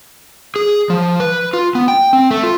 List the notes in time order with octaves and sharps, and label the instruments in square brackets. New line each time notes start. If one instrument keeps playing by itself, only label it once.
[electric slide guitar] G#4
F3
B4
F4
B3
G5
C4
A3
F4